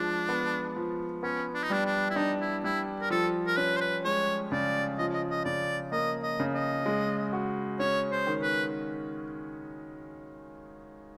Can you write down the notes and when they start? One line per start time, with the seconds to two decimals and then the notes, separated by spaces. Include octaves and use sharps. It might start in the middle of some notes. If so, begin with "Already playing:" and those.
Already playing: F3 G#3 D4
0.29 B3
0.76 F3
1.23 B3 C#4
1.54 D4
1.63 D#4
1.70 G3 D4
1.85 D4
2.10 E4
2.16 D4 D#4
2.41 E4
2.64 G3 E4
3.01 A#4
3.10 F3 A4
3.47 A#4
3.57 C#4 B4
3.77 C5
3.81 B4
4.05 G#3 C#5
4.52 C#3 D5
4.98 F3 D#5
5.14 D#5
5.30 D#5
5.45 C#3 D5
5.92 A#3 D#5
6.23 D#5
6.40 C#3
6.54 D#5
6.86 G#3
7.33 F#4
7.79 C#4 C#5
8.12 C5
8.27 D#3
8.42 B4